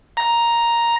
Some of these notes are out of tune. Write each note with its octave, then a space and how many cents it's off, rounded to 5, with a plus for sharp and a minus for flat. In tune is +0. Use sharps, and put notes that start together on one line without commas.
A#5 +5